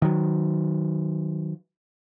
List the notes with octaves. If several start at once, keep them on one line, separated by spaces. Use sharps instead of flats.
D#3 F#3